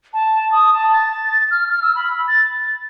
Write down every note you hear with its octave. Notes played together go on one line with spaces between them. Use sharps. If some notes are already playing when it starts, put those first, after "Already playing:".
A5
D#6
A5
A6
F6
F6
E6
B5
A6